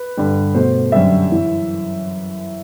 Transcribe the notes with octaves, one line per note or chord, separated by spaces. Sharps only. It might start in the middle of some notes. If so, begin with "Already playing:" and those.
Already playing: B4
G2 D3 G3
B2 A3 C5
F#2 D3 G3 E5
E3